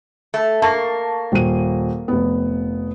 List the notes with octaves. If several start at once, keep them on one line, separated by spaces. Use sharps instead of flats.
A3
A#3 A5 C#6
D#1 D#7
F1 B3